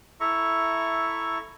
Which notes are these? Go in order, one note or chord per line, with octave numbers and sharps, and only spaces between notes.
E4 A4 E5 A#5 C#6